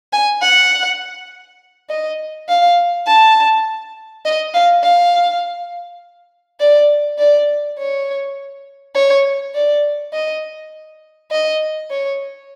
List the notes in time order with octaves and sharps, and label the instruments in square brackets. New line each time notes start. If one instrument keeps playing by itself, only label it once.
[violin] G#5
F#5
D#5
F5
A5
D#5
F5
F5
D5
D5
C#5
C#5
D5
D#5
D#5
C#5